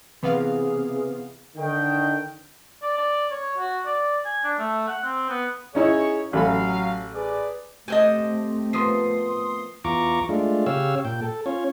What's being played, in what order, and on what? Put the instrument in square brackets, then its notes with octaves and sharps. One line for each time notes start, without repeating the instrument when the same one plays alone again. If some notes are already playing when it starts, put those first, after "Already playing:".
[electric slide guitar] C3 [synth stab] E3 B3 F5 [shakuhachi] G#4
[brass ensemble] D3 D#3 G5
[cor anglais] D5
D5
C#5
F#4
D5
G#5
D4
A3
F#5
C4
B3
[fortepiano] C#4 D#4 E4 [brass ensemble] G#4 C#5
[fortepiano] A1 A4 B5 [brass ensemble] F#3 F5
[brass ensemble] G#4 B4 D5
[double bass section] A3 C4 [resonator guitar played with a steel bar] G4 C5 D#5 [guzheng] A4 F#5 G#5
[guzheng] F3 A#3 B3 [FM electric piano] C6 D#6 C7
[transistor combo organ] E2 F4 A#5 C#6 D6
G#3 A3 D4 F4
C#3 G4 C#5 F5 E6
A#2 G5
A4
C#4 F4 C#5